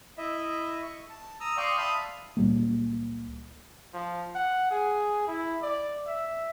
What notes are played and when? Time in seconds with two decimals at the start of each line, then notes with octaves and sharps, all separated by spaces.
0.18 E4 D#5 E5
0.82 C#6
1.10 A5
1.40 A#5 D#6 E6
1.57 D5 F5 G5 C6 C#6 D#6
1.78 E5 F5 A5 B5 D#6
2.37 C#2 A#2 G3 A#3
3.93 F3
4.35 F#5
4.71 G#4
5.27 E4
5.62 D5
6.07 E5